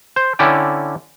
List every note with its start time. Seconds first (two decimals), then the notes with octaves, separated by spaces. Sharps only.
0.16 C5
0.39 D3 C#4 E4 D5 G5